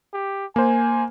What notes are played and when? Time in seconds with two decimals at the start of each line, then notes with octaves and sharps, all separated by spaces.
0.14 G4
0.56 A#3 C5 G#5